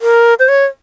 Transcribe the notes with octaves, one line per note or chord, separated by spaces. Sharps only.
A#4
C5
C#5